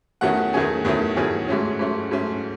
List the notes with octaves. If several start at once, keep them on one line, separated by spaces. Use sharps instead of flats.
E2 D#3 F#3 A3 C#4 F#5
E2 D#3 F#3 A3 C#4 G#4
E2 D#3 F#3 A3 C#4
E2 D#3 F#3 A3 C#4 G#4
G#2 F#3 A3 C#4
G#2 F#3 A3 C#4
G#2 F#3 A3 C#4